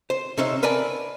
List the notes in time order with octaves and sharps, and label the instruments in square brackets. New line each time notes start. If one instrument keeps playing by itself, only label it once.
[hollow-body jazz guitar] C5
C3 C#4 D#4 C5 E5
A#4 B4 D5 G#5 A5